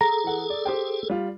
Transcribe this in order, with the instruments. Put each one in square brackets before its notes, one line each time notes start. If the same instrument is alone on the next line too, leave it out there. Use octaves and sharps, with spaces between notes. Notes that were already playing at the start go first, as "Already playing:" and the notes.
[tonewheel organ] G#4 A4 [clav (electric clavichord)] A#5
[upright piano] E3 F#5
D5
G4 C5 G5
G3 F4